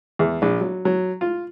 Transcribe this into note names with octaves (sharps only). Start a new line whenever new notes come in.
E2
A#1
F#3
F#3
F4